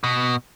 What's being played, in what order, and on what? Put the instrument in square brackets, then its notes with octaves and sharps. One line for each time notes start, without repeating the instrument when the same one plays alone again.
[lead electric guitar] B2